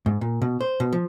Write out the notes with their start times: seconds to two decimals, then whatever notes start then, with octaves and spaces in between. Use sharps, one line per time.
0.06 G#2
0.21 A#2
0.42 B2
0.61 C5
0.80 B2
0.93 F3